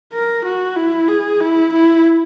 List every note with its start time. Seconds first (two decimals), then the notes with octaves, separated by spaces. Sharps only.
0.13 A#4
0.45 F#4
0.76 E4
1.08 G#4
1.40 E4
1.72 E4